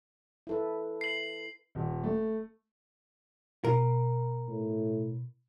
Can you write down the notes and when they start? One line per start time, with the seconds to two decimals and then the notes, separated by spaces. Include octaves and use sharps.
0.47 E4 A4 B4
1.01 C7 F#7
1.75 D#1
2.04 A3
3.65 B2 A#4
4.48 A2